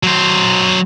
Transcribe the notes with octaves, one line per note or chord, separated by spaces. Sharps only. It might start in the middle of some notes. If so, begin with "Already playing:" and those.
F#3 C5